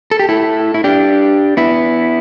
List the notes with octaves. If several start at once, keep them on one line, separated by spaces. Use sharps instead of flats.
A4
G4
E4 A4
E4
D4 G4
B3 E4